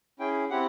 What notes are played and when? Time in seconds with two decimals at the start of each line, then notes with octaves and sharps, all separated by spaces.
0.19 C#4 E4 G#4 G5
0.50 C4 E4 G4 F#5